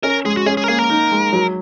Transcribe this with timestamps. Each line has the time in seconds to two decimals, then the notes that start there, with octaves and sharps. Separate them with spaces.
0.03 C#4 A#4
0.25 G#3 G#4
0.37 F#4
0.46 C#4 G#4
0.57 G#4
0.64 A#4
0.68 A#3 G#4
0.79 A#4
0.90 D#4
1.12 G#3
1.33 F#3